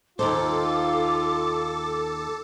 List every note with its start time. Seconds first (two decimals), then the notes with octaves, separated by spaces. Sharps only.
0.19 D#2 D#4 F4 A4 C5 D6